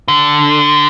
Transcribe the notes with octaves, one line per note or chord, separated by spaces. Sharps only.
D3